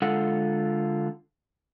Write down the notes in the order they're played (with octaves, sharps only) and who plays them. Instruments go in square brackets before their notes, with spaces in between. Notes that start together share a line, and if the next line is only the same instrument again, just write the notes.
[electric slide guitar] D3 G#3 F4 A4 F#5